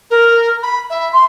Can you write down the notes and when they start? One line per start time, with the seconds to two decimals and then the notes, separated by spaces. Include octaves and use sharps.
0.11 A#4
0.63 B5
0.90 E5
1.13 C6